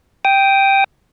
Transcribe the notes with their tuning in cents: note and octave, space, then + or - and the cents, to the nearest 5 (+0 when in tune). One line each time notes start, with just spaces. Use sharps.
G5 +0 D#6 +0